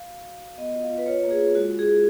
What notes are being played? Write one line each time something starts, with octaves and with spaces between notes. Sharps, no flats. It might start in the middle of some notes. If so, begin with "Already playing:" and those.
Already playing: F5
F#4
F#4
F#4
B3 D#5
F4
F5
F4
B4
F4 C#5
A#3
G#4
F4
G#3 F#4
G#3
G#4
G#3